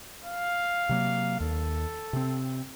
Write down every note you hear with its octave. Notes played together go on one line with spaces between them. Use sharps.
F5
C3 F#3 A#3
D#2 A4
C3 C4